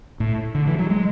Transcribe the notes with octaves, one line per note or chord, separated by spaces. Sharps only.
A2
D3
E3
F#3
G#3